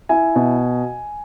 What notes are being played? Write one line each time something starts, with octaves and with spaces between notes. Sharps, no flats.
E4 G#5
B2